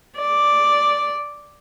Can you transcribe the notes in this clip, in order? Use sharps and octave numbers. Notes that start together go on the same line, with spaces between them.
D5